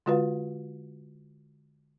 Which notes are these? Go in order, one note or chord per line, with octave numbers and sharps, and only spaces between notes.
D3 G#3 F4 F#4 B4 F5